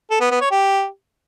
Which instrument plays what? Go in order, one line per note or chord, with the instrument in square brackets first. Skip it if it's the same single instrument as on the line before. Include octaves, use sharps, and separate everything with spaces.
[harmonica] A4
B3
B3
C#5
G4